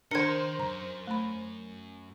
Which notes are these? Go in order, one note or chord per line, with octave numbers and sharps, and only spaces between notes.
D#3 D4 A#4 C5 D#5 G#6 C#7
F#2 A#5
A3 B5